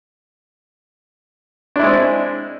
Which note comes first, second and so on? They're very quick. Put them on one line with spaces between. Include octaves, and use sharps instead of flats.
D4 E4 G#3 C4